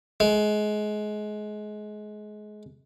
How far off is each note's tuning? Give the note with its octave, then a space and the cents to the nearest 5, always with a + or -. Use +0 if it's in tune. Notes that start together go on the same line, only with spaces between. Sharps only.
G#3 +25